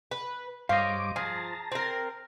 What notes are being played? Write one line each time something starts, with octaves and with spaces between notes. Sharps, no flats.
B4
G2 C5 C#5 D#5 F5 D6
F3 G#4 A5 A#5
C4 A#4